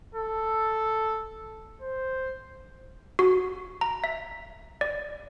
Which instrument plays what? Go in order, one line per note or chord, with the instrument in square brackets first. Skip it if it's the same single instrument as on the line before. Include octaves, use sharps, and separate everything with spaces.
[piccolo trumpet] A4
C5
[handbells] F#4
A#5
E5
D5